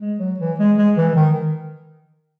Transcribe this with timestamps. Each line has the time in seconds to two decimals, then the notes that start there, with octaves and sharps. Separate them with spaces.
0.01 G#3
0.20 F#3
0.39 E3
0.59 G#3
0.77 G#3
0.97 E3
1.15 D#3